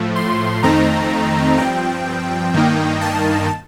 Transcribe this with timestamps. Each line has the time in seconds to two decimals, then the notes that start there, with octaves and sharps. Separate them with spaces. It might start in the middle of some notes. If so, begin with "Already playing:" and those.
Already playing: A2 F3 A3
0.16 C6
0.63 F2 D#3 A3 C4 D#4 A#5
1.58 G2 F3 C4 G5
2.54 G2 D#3 A#3 D#4
3.01 A5